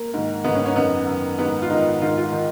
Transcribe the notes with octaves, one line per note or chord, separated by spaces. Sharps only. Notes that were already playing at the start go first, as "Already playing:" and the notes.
Already playing: A#3
G#2 D#3
G#2 D#3 B3
C#4
C#4
F#2 D#3 B3
F#2 D#3
G#2 D#3 B3
F4
G#2 D#3 D#4
G#2 D#3 F4
F4
D#3